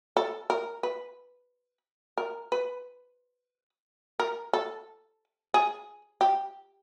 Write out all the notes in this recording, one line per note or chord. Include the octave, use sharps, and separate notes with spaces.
A4
A#4
B4
A#4
B4
A#4
A4
G#4
G4